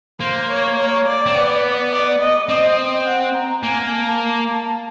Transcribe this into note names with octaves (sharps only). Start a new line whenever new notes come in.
A#3 C5
C#5
C#5
D5
C4
B3
D5
D#5
C4 D#5
F#5
A#5
A#3 G#5
A5
A5